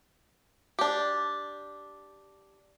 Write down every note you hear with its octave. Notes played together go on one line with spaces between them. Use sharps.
D4 G4